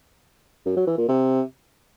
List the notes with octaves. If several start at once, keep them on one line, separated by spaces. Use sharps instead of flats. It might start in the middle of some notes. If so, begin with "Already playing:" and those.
F#2
F#3
E3
A#2
C3